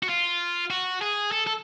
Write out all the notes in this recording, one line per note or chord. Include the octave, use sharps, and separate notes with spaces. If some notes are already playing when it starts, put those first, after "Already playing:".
F#4
F4
F#4
G#4
A4
A4